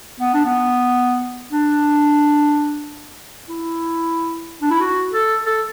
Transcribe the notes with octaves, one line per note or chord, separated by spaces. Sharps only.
B3
D4
B3
D4
E4
D4
E4
F#4
A4
A4